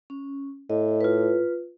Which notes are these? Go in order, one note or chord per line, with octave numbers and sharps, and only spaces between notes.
C#4
A2 D#5
F4 B4